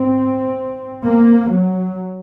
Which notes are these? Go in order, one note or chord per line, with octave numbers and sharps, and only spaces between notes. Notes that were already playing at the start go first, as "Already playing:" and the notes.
Already playing: G#2 C4
A#3
F#3